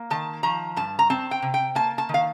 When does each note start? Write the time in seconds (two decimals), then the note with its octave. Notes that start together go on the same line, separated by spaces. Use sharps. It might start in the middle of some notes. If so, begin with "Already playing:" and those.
Already playing: A#3
0.10 D#3 A5
0.43 F3 A#5
0.76 G2 A5
0.99 A#5
1.10 C4 A5
1.31 G5
1.42 C3
1.54 G5
1.75 A#3 A5
1.98 A5
2.09 D#3
2.14 F5